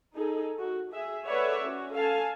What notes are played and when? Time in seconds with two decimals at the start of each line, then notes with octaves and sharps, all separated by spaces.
0.14 D#4 G#4 A4
0.59 F#4
0.92 G#4 E5
1.27 A4 B4 C#5 D5 E5 F#5
1.64 C#4 F#4
1.95 A4 F5 G#5 A5